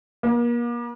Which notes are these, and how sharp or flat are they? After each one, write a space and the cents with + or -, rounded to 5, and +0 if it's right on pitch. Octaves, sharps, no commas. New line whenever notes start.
A#3 +40